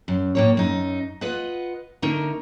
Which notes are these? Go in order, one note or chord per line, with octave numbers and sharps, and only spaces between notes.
F#2
A2 A#3 C#5
F#2 D#4
F4 B4 D#5 F#5
D3 A3 D#4 A#4